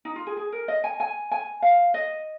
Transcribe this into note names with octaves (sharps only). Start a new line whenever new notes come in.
D#4
F4
G#4
G#4
A#4
D#5
G#5
G#5
G#5
F5
D#5